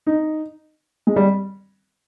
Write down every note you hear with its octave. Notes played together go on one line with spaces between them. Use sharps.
D#4
G#3
G3